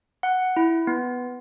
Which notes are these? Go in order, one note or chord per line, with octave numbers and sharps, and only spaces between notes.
F#5
E4
B3